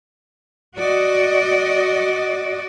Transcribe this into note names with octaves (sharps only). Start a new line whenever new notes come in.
F#4 D5 D#5